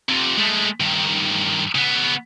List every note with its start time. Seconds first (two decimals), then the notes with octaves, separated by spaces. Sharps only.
0.09 F2 C3
0.37 G#3 A3
0.80 G2 D#3
1.75 C#3 B3